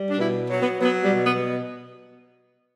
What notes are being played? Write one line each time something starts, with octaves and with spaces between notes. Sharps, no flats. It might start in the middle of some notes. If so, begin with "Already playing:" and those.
Already playing: G3
D4
B2 E4
F#3
B3
F#3 B3
G3
B2
B3